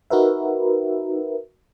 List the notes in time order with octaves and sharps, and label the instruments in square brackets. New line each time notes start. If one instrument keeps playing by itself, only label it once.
[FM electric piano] D#4 F#4 A#4 B4 E5